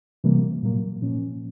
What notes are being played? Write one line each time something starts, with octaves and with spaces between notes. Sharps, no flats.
C3 E3 G3 A#3
A#2 F#3 A#3
A#2 F3 A#3 C#4